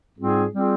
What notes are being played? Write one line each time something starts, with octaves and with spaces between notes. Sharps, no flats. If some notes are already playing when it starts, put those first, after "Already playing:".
G#2 G3 C4 F4 G#4
G3 C4 F4 G#4